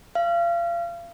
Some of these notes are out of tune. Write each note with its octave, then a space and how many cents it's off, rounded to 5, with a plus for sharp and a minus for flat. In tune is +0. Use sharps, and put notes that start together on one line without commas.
F5 -30